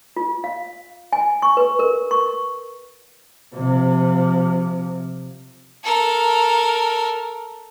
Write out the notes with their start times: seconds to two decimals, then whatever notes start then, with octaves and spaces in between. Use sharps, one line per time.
0.16 F4
0.44 F5
1.13 G#5
1.42 C#6
1.57 B4
1.79 A#4
2.11 C#6
3.55 C3 F3
5.84 A4 A#4